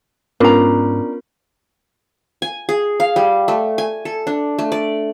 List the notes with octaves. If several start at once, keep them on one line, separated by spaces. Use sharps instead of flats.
G#2 B3 C#4 D4 F4 A#4 A#5
G#5
G#4
F5
G3
A3
G#5
A4
D4
A3
D5